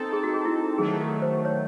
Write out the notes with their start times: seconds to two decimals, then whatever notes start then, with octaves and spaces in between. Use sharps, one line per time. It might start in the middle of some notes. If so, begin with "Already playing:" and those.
Already playing: C4 D#4 A4
0.13 G#4
0.23 F#4
0.33 G#4
0.45 E4
0.78 D#3 F#3 A3 G#4
1.00 A4
1.22 C5
1.45 C#5